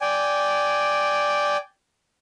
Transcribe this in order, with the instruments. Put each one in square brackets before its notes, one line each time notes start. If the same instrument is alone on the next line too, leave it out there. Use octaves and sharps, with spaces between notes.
[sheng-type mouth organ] D5 G5 G#5